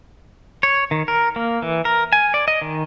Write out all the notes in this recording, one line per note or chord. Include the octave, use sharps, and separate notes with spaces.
C#5
D#3
A#4
A#3
E3
A#4
G#5
D5
D#5
D#3